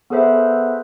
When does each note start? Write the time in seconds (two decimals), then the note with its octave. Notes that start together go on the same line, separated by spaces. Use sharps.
0.10 B3 G#4 A4 B4 C5 E5